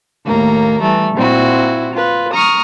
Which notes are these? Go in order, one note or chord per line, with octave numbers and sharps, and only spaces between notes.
D#2 A2 A#3 A#5
E3 G3 A3
A#2 A#3 C4 E4 F#4
F4 B4
A#5 C#6 D#6 F6